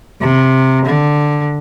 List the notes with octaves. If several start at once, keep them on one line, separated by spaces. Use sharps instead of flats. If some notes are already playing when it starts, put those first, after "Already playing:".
C3
D3